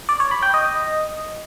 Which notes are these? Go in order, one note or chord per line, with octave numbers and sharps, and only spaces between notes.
D5
C#5
B5
G5
D#5